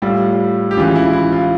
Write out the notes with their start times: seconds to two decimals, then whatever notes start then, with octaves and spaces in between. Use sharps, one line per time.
0.02 A2 G3 F4
0.71 G4
0.76 C#2 C#3 E3 F4
0.96 E4
1.13 E4
1.32 F4